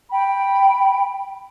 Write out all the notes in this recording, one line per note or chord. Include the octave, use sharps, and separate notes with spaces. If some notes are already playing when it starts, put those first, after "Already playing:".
G5 B5